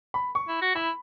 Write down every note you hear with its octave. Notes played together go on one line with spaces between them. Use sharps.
B5
C#6
E4
F#4
E4 B5